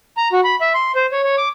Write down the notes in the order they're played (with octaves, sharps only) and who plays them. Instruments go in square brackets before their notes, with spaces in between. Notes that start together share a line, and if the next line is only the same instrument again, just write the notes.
[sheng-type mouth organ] A#5
F#4
B5
E5
C6
C5
C#5
C#5
D6